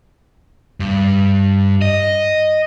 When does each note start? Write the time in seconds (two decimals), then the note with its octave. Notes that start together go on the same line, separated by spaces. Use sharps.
0.80 G2
1.82 D#5